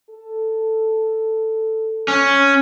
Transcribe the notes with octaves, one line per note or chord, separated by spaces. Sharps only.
A4
C#4